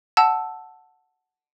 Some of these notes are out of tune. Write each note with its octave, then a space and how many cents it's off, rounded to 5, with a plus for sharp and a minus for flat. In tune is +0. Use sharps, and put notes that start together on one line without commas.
F#5 +0 A5 +0 E6 +0